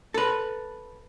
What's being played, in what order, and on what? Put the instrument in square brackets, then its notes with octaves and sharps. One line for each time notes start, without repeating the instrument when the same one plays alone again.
[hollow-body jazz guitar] A4 B4